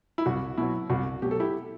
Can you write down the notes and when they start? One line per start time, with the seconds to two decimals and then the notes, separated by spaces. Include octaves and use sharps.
0.18 E4
0.26 C2 F#4
0.57 B2 F#3 E4
0.90 C2 F#4
1.22 B2 F#3 G4
1.31 A4
1.40 E4 G4